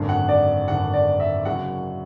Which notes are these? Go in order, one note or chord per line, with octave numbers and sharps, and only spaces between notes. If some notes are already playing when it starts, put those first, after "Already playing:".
Already playing: G#1 F#2 D3
F#5
D5
G#1 F#2 D3 F#5
D5
E5
F#1 F#2 C#3 F#3 F#5